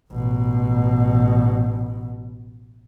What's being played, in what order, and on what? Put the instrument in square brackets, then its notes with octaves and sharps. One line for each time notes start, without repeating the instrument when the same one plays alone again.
[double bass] A1 B2